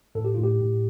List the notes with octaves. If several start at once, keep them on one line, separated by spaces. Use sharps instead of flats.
A2 A4
G4
A2 F4
G4
A2